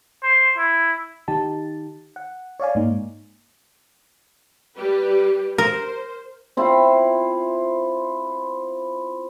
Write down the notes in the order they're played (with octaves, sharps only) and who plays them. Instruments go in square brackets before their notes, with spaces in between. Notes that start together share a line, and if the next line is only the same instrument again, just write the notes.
[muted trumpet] C5
E4
[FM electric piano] D#3 D#4 G4 A5
F#5
C#5 D5 F5 G#5
G#2 A#3 D#4
[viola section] G3 G4 B4
[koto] A#4 [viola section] C5
[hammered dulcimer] C4 E4 F4 C5